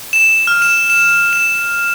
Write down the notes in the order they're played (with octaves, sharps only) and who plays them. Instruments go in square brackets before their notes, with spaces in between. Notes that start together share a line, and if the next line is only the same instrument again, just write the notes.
[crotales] E7
F6
E7
E7
E7